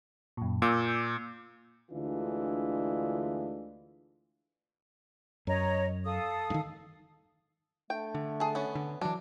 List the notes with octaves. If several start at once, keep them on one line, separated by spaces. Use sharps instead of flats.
F#2 A#2
A#2 D6 E6 G6
D2 D3 E3 G#3 D4 F4
F#2 C#5 D#5 A#5
A4 F5 D#6
G2 D#3
A3 D4 G5
D3
G#4 A5
B3 C#4
D3
E3 F#3 D4